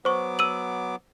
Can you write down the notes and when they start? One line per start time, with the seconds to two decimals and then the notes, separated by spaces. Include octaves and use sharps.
0.05 F#3 B3 C5 C#6 D6
0.39 E6 D#7 F#7